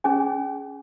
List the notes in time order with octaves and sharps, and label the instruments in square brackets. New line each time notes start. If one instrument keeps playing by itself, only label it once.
[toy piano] C#4 G#4 G#5